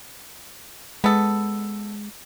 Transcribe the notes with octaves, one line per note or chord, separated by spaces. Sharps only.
G#3 B3 A4